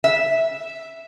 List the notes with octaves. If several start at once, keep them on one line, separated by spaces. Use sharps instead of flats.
E5